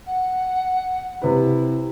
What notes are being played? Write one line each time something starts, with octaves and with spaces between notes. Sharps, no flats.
F#5
C3 E4 B4